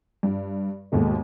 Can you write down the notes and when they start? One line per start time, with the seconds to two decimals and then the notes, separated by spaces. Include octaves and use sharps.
0.23 G2
0.92 D#2 G#2 B2 A3